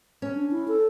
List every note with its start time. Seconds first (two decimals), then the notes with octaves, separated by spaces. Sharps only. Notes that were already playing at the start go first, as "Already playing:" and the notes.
0.22 C#4
0.35 D4
0.51 E4
0.68 A4